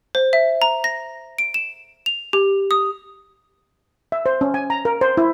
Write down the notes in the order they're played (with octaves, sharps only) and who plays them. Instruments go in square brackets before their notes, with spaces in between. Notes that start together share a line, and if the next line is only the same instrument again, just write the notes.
[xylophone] C5
E5
A#5
A#6
D7
E7
F7
G4
D#6
[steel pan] E5
C5
C#4
G#5
A#5
A#4
C5
E4